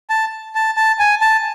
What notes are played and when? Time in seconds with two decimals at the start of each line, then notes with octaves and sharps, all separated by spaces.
0.10 A5
0.55 A5
0.77 A5
0.99 G#5
1.21 A5